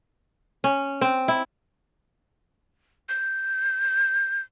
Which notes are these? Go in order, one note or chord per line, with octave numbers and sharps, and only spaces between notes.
C#4
C4
E4
G6